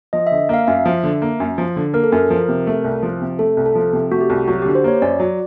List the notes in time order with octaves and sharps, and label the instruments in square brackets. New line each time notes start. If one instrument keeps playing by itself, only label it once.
[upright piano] F3 [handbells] D#5
[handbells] E5
[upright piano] D3
[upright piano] A#3 [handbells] F5
[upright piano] F#2 [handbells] E5
[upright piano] F3
D3
A#3
F#2
F3
D3
[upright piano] A#3 [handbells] A#4
[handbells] A4
[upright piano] F#2 [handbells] A#4
[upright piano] F3
C3
A3
C2
F3
C3
[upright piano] A3 [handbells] A4
[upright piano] C2
[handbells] A4
[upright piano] F3
C3
[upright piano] A3 [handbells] F#4
[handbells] G4
[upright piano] C2
[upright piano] F#3 [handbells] F#4
[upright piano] D3 [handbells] G4
[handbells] C5
[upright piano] A#3 [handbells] C#5
[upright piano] F#2 [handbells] D5
[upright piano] F#3